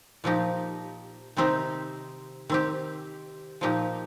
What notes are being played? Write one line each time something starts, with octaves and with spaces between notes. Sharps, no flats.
A#2 F3 D#4 G4
C3 D#3 C4 D#4 G4
D#3 C4 G4
A#2 F3 D#4 G4